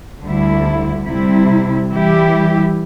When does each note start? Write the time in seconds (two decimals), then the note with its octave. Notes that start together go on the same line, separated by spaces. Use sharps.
0.23 D2 D3 G3 E4
1.07 C3 G3 E4
1.90 E3 G3 E4 G4